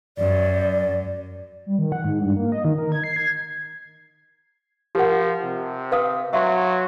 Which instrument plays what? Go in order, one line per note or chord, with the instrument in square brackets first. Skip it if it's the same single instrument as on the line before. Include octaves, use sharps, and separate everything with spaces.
[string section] F#2 [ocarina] D5
[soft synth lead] G3
D#3
F#5
G#2
G2
A#3
D#5
D#3
A#4
G#6
C7
G#6
[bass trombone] F3 [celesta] G4 A#4 F#5
[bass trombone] C3
[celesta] B4 F5 D#6
[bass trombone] F#3 [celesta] E5 F5 C6